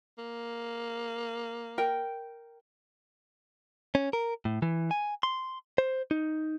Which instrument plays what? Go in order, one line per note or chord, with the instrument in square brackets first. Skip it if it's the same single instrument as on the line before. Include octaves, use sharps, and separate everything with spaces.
[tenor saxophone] A#3
[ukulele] A#4 G5
[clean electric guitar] C#4
A#4
A2
E3
G#5
C6
C5
D#4